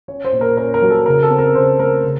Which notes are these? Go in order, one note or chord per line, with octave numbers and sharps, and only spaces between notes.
C#4 C#5
C5
A#2
A#4
C#4 A#4
A#4
F#3
A4
C#3 A#4
A4
C4
A#4
C#3 C5
A3 A#4
C#3